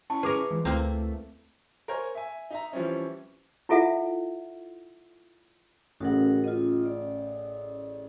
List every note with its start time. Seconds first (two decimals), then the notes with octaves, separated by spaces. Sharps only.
0.10 C#4 E4 A5 C#6
0.23 G#4 A#4 B4 D6
0.51 E3 F3 G#3
0.65 D2 A3 A#3 C4 E4
1.88 A#4 C5 C#5 G#5
2.15 E5 G#5
2.50 D#4 E5 A#5
2.73 E3 F3 G3 C4 C#4
3.69 E4 F4 A4 E5 F#5
6.00 A1 C#3 F#4 A#4 F#5
6.44 F4 D#5
6.85 D5